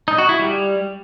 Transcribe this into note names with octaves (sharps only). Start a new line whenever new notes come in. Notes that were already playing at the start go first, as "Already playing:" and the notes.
D#4
F#4
E4
G3